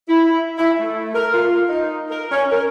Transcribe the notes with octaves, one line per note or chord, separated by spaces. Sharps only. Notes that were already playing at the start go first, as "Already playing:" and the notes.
E4
E4
A3
A#4
F4
D#4
A#4
C#4
A#4